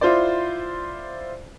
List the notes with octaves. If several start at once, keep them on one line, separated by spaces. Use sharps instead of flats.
E4 F4 C5 D5